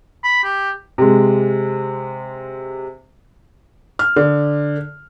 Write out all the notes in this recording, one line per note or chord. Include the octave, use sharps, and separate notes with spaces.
B5
G4
C3 G#3
F6
D3